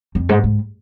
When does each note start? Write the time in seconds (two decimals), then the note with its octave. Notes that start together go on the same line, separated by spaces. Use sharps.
0.15 F2
0.29 G#2
0.44 G#2